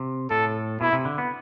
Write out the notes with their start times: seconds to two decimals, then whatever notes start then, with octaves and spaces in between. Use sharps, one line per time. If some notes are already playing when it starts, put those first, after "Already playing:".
Already playing: C3
0.30 A2 A4
0.81 B2 E4
0.93 C3
1.05 D3
1.18 B3